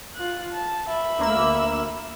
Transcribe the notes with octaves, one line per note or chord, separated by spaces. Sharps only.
F4 F#6
A5
E5 B5
D2 A#3 E6